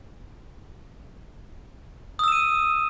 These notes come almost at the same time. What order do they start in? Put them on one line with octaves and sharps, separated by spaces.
D#6 E6 E7 D#7